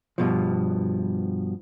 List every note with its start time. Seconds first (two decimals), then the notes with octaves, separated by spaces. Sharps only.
0.18 G2 B2 F3